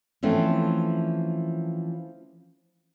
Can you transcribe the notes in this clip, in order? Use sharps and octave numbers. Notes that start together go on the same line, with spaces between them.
E3 F3 A3 C4 C#4